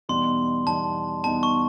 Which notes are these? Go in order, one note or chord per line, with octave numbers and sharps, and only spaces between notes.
E2 B2 G3 B3 D#4 C6
E2 B2 G3 B3 D#4 A5
E2 B2 G3 B3 D#4 A5
C#6